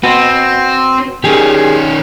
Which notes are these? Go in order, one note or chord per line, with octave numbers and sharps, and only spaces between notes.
C4 F#4 B4
D#3 C#4 G4 G#4